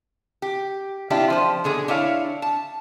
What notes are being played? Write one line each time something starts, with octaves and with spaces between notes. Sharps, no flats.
G4
C4 D4 E4 F4 G4
F3 C5
B2 D3 G#4
D4 E4 C#5 F5
A5